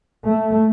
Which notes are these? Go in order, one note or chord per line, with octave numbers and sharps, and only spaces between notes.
A3